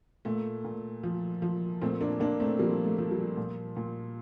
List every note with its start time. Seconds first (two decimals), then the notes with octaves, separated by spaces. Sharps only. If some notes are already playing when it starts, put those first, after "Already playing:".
0.25 A#2 A3
0.65 A#2
1.04 F3
1.42 F3
1.81 A#2 A3 C4
2.01 A#3 D4
2.20 A#2 A#3 D4
2.40 A3 C4
2.59 F3 G3 A#3
2.85 A3
2.99 F3
3.11 G3
3.37 A#2
3.77 A#2